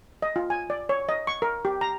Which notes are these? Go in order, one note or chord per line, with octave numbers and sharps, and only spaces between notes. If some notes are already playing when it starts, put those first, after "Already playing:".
D#5
F4
G#5
D5
C#5
D#5
C#6
A#4
G4
A#5